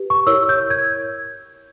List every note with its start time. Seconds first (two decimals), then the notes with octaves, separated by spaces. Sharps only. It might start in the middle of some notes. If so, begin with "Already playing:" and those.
Already playing: G4 B4
0.10 C#6
0.27 E4 A#4 C#5 E6
0.49 G6
0.70 G#6